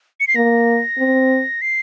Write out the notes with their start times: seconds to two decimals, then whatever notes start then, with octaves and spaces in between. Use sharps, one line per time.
0.20 C#7
0.28 C7
0.36 A#3 A#6
0.98 C4
1.62 C7